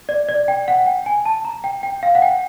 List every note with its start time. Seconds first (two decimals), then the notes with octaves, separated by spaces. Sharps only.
0.09 D5
0.29 D5
0.48 G5
0.68 F#5
0.86 G5
1.06 G#5
1.25 A5
1.45 A#5
1.64 G5
1.83 G5
2.03 F5
2.15 F#5
2.22 G5